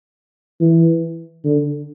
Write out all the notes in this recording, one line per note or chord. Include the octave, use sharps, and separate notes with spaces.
E3
D3